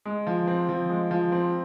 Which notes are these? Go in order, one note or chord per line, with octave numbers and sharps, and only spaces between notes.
G#3
F3
C4
F3
G#3
F3
C4